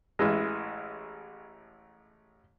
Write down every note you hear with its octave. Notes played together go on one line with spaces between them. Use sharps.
A1 E3 G#3